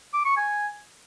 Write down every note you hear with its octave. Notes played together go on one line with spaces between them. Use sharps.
D6
C#6
G#5